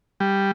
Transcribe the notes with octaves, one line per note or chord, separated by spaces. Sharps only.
G3